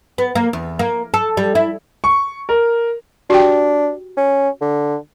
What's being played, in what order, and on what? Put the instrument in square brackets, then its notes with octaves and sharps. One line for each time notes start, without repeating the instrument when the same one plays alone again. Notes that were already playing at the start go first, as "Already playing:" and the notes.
[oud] B3
A#3
E2
A#3
A4
G3
E4
[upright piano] C#6
A#4
[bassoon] D4 [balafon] F#4 G4 G5
[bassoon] C#4
D3